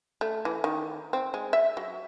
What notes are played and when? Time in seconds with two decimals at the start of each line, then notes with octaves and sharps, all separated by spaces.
0.21 A3
0.45 E3
0.64 D#3
1.13 C4
1.34 G#3
1.53 E5
1.77 F#3